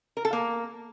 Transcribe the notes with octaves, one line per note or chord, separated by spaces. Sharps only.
A#4
A4
A#3